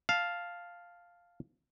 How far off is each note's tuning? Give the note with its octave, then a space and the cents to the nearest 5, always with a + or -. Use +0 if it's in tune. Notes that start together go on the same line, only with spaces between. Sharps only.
F5 +0 A5 +0